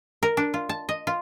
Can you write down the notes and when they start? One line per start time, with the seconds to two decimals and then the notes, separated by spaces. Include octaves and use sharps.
0.23 A#4
0.37 D4
0.54 F4
0.69 A5
0.89 D#5
1.07 F4